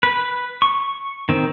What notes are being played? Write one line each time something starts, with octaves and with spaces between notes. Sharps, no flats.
B4
C#6
D#3 C4